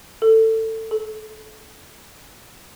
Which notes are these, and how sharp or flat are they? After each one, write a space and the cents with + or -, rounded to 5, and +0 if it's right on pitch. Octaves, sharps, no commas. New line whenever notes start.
A4 +20
A4 -35